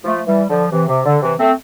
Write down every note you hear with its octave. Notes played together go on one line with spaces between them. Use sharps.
F3 A3
E3 G3
D3 F3
C3 E3
C3
D3
C3 E3
A3 C4